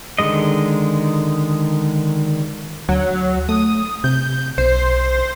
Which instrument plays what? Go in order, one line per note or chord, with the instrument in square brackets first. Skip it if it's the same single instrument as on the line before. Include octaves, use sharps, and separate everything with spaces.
[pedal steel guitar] D3 D#3 G#3 D#5
[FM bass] D2 [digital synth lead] F#3
[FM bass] A3 [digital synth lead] D#6
[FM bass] C3 [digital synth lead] G6
[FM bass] B1 [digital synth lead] C5